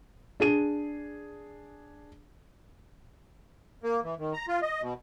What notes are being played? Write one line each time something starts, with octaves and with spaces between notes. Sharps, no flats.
D4 G#4 D#7
A#3
E3
D#3
A#5
F4
D#5
B2